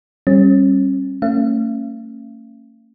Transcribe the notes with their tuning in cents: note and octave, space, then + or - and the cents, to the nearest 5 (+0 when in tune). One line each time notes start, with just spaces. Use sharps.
G3 +0 C#4 -30
A3 +45 C#4 -15 F5 -45